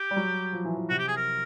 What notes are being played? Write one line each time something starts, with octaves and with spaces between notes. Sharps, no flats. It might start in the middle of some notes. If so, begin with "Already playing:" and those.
Already playing: G4
G3
F#3
F3
E3
E3
C3 F#4
G4
G#4
A#4